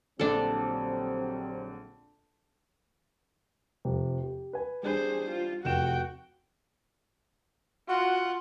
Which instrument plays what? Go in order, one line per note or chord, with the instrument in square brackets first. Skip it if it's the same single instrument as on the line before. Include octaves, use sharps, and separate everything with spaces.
[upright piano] A#1 D3 [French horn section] F#3 G3 C4 [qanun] D4 A4
[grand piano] F1 F2 C3
G4
B4 G#5
[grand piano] G3 D4 [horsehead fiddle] G#4 C5
[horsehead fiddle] F4
[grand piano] F1 E7 [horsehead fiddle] F#4 G5
[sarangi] F4 [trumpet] F#4 [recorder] F#5